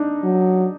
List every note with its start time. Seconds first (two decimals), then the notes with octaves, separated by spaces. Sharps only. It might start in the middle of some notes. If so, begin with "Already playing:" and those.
Already playing: D4 D#4
0.24 F#3